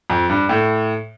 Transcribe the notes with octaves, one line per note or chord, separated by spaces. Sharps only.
F2
G2
A2